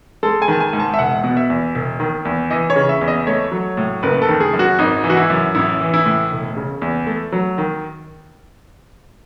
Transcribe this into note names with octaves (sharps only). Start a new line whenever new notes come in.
G#3 A4
G#5
D#3 A5
G#5
G#2
A5
E5
E1 F#5
B2
E5
E2
E1
D#3
E2
E3 D#5
C#5
C#3
E5
E2
D#5
A3 C#5
F#3
A2
F#1 B4
A4
D#3
G#4
F#2
F#4
G#1 D#4
E3
F#4
E4
F#2
A1 E4
E3
E4
A2
E1
C#3
E2
A3
F#3
D#3